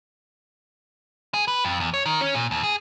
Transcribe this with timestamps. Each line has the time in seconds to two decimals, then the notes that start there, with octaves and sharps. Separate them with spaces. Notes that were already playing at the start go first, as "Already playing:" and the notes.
1.34 G#4
1.48 B4
1.65 F2
1.80 E2
1.94 C#5
2.05 D#3
2.21 C#4
2.35 A#2
2.51 D#2
2.63 G#4